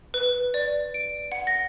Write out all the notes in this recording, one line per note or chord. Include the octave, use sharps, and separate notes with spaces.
B4
D5
D7
F#5
A#6